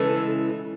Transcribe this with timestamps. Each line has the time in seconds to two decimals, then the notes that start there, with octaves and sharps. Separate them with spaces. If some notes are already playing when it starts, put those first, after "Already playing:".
Already playing: C#3 E3 G#3 A4